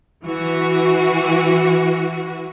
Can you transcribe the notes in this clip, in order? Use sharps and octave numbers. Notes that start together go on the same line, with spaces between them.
E3 F#4